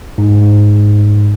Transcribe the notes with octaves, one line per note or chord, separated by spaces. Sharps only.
G#2